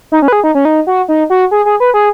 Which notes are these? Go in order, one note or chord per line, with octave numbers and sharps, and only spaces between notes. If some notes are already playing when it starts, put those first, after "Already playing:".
D#4
C#4
B4
G#4
D#4
C#4
D#4
F#4
D#4
F#4
G#4
G#4
B4
G#4